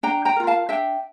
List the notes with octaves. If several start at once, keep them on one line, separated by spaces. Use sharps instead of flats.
D4 G5 A#5
G5 A#5
F4 A#4
F5 A5
D4 E5 G5